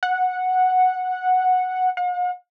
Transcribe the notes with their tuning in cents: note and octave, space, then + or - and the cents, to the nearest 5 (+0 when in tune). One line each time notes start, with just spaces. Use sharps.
F#5 -5
F#5 -45